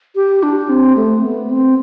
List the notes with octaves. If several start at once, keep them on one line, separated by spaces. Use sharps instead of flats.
G4
D4
C4
A3
B3
C4